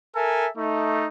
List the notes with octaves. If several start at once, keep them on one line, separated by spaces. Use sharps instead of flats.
A4 A#4 E5 G#5
A3 D#4